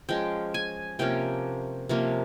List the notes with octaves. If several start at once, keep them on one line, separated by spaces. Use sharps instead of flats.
F3 G#3 C#4 G5
G#5
C3 F3 A#3 C#4 G5
C3 F3 A#3 C#4